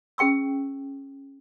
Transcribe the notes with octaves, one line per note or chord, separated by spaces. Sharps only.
C#4 G#4 G5 C#6 E6